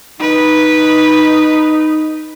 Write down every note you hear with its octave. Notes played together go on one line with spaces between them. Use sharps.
D#4 B4